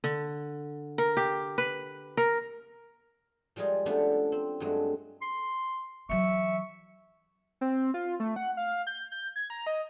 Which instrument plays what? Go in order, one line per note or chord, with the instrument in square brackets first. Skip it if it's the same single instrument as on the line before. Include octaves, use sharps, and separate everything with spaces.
[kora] D3
A#4
G4
B4
A#4
[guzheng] F3 G3 G#3 F4 G#4
F3 A3 B3 C#4 D4 G4
C4
G2 F#3 G#3 A3
[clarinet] C6
[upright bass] E3 F#3 [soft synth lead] E5 [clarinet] C#6
[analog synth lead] C4
F4
A3
F#5
F5
G6
G6
G#6
A#5
D#5